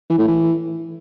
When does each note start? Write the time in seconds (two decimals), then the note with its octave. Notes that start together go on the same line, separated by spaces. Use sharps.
0.10 E3
0.18 A2
0.27 E3